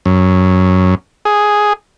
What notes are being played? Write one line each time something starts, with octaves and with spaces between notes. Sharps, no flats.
F#2
G#4